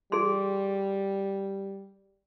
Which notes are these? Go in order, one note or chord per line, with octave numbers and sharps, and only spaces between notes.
G3 G#4 C6